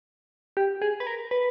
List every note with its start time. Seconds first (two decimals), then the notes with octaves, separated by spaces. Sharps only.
0.57 G4
0.82 G#4
1.00 B4
1.07 A#4
1.31 B4